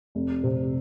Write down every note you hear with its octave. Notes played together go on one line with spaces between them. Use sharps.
F1
C3